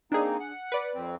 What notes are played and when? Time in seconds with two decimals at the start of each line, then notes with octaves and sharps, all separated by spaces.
0.12 A#3 C4 D4 D#4 G#4
0.40 F#5
0.72 B4 D5
0.95 F2 C4